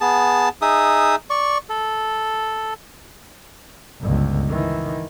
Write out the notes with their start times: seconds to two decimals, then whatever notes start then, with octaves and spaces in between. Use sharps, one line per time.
0.01 B3 G#4 A5
0.62 D#4 G#4 E5 D#6
1.30 D5 C#6
1.69 A4
4.01 G1 C#2
4.48 D#3 E3